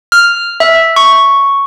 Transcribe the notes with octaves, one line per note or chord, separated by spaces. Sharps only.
F6
E5
C#6